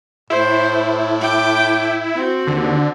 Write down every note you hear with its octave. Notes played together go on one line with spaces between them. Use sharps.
A2 E4 C5
G5 D6
C4 F#4
D#2 D3